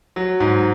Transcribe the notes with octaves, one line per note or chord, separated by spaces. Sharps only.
F#3
G#2